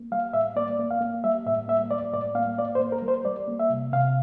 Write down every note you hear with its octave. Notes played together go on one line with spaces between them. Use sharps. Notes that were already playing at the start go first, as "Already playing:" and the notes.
Already playing: A#3
G3 F5
A2 E5
A#3 D5
A#3
F5
A#3
G3 E5
A2 E5
A#3 E5
G3 D5
A2 D5
A#3 F5
A#3 D5
C5
A#3
A#4
G3
C5
G3 D5
A#3
E5
C3
C3 F5